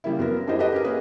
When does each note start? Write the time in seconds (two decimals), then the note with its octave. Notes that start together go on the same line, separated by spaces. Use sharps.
0.04 C#3 G3 A#3 E4
0.18 F#2 B3 A#4
0.47 D4 E4 G4 G#4 C5 D#5
0.59 G4 A4 B4 D#5
0.72 G4 G#4 A#4
0.84 A#3 C#4 G#4 B4